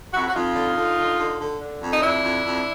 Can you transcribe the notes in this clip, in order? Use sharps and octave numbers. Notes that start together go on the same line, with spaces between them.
F2 E4 F#4
F#4
F2 D#4 F4
D3
D3
D3
D3
D3
D3
F2
D#4
F2 D4 E4
F2
F2